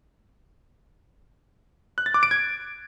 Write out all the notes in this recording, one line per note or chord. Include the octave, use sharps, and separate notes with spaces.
F#6
A6
D6
D7
G#6